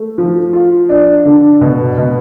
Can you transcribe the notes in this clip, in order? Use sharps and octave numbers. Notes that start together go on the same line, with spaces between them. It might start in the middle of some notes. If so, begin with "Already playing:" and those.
Already playing: A3
F3
F4
D4
D3
B2
B2